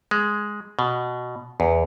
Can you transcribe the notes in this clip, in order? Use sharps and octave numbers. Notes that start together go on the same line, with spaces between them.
G#3
B2
E2